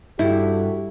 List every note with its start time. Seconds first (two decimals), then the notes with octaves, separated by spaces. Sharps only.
0.19 G2 E4 F#4 G4 A4